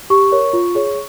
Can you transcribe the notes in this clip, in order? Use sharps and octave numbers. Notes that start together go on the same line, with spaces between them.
G4 C#6
A#4 C#5
F4
G#4 C#5